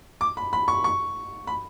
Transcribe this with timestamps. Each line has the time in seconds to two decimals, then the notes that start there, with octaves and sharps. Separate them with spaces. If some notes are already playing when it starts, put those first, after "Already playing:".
0.21 D6
0.37 B5
0.53 B5
0.68 C#6
0.84 C#6
1.47 B5